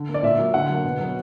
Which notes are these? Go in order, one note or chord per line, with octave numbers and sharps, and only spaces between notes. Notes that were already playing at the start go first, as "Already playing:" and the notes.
Already playing: D3
A#3
D5
A#2 E5
F#3 A#3
D3 F#5
F#3 A#3
B2
F#3 B3